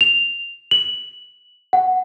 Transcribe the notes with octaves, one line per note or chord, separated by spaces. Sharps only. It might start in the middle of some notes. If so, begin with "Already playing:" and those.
F7
F#7
F#5